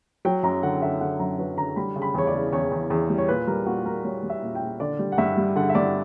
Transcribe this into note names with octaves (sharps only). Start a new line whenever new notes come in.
F#3 G5
F#2 A#5
D3 F#5
D3 E5
D3 F#5
F#2 A#5
F#3 B4
D3 A#5
G3 B5
C#3
B5
E2 C#5
D5
C#3
E2 C#5
E2
E2
G3
C#5
A#2 B4
G3 A#4
A#2 F#4
G3 A#4
G3 C#5
G3
E5
A#2
G5
A#2
D3 D5
G3
F#5
G2 E5
G3
D3 F#5
E5
G2 D5